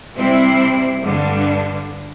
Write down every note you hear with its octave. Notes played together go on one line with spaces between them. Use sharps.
C3 G3 C4 E4
G2 D3 G3 D4